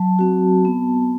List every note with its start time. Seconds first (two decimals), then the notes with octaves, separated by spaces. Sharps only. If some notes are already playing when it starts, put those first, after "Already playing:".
Already playing: F#3 A5
0.19 C4 F#4
0.65 B3